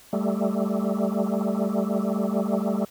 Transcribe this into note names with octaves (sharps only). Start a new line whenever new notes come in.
G3 A3